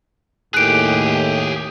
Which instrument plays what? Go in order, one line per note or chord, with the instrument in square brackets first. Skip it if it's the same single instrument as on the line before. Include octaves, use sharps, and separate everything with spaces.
[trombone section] D#2 A2 [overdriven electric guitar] G4 G#4 [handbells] F#6 D7